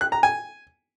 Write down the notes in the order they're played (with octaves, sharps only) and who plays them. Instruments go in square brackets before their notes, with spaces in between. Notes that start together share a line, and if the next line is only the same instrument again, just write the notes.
[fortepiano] F#6
A#5
G#5